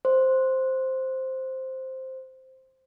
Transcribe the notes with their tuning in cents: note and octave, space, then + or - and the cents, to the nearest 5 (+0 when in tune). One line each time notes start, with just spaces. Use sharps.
C5 +0